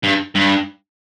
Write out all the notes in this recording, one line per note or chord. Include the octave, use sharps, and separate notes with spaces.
G2
G2